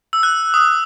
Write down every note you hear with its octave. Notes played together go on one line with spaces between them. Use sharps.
E6
F#6
D#6